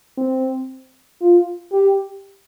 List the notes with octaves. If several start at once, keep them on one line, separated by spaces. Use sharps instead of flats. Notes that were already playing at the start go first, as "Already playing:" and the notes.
C4
F4
G4